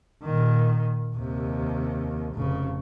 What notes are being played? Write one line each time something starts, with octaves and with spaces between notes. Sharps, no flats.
A#2 D#3
D#2 C3
F1 C#3